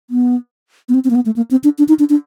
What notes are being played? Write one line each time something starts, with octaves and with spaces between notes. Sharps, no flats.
B3
B3
C4
C4
A#3
B3
A3
A#3
C4
D4
D4
D#4
D4
D4